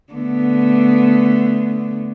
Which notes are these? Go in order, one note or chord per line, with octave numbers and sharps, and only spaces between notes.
D3 A3 B3